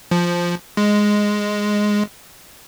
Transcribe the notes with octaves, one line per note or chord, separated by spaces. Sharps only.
F3
G#3